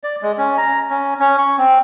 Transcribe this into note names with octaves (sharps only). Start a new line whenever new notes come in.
D5
G#3
C#4
A#5
C#4
C#4
C#6
C4